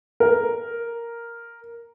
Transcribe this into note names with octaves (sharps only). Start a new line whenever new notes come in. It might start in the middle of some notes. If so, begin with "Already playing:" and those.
A#4